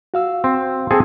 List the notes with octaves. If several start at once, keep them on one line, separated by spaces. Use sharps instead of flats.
F#4 F5 E6
C4
C4 G#4 A4